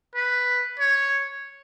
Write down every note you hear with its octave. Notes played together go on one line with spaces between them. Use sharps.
B4
C#5